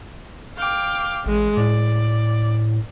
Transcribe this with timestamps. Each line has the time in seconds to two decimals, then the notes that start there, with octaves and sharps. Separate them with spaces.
0.56 F5 G5 D6
1.26 A1 G#3
1.57 A2 D5